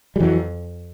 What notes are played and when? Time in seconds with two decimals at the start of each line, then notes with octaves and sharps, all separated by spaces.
0.16 G3
0.20 F2 E3 F#3